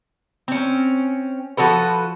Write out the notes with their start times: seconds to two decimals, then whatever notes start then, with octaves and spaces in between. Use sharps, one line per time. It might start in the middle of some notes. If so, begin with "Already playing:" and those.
0.48 C4 C#4
1.57 F3 F#4 A4 B4